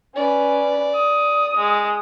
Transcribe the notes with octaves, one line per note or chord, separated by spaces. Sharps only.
C#4 B4 D5
D#6
G#3